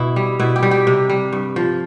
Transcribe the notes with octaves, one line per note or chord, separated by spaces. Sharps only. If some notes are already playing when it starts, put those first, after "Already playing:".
Already playing: B2 E4
G3
B2 E4
G4
G3
G4
C3
G3
G2
F3